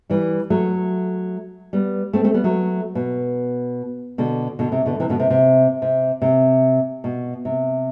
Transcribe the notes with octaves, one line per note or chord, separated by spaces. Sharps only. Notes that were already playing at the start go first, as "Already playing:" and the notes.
E3 G3
F#3 A3
G3 B3
A3 C4
A3 C4
G3 B3
F#3 A3
B2
B2 D3
B2 D3
C3
B2 D3
C3 E3
B2 D3
C3
C3
C3
C3
B2
C3